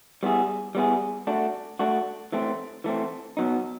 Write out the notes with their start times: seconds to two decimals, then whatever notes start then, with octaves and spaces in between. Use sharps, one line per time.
0.23 G3 B3 E4 G#4
0.75 G3 B3 E4 G#4
1.27 A3 D4 F#4
1.79 A3 D4 F#4
2.32 E3 A3 C4
2.84 E3 A3 C4
3.37 B2 F#3 B3 D#4